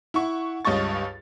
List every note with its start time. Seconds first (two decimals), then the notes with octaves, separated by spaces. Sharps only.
0.14 E4 F#5 C#6
0.65 C#2 G2 C#5 D#5 C#6 A6